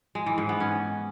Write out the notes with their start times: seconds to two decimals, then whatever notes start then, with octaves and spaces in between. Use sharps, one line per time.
0.15 G#3
0.26 E3
0.38 G#2
0.49 B3
0.60 C#4